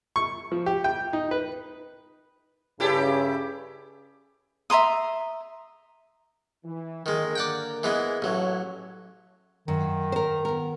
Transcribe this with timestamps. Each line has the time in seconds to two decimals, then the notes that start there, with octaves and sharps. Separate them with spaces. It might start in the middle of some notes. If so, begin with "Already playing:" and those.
0.16 C#6
0.52 F3
0.66 G4
0.84 G5
1.13 D#4
1.31 B4
2.80 G2 C#3 E4 G4 A4
4.70 E5 A#5 C6 D#6
6.65 E3
7.06 D3 D#3 G#3 A#3 A#4
7.36 D5 F#5 G5
7.83 E3 G#3 B3
8.22 A1 F#3 A4 C#5 E5
9.68 F#2 D#3
10.12 A#4 C5
10.45 B3 A#4